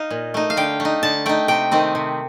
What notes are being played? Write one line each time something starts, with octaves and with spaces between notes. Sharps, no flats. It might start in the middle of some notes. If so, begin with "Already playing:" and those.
Already playing: D#4 F5
A#2
A3 D#4
F5
D3 G5
A3
D#4
D3 A5
A3 D#4 G5
C3 G5
D#3 A3 C4 D#4
C3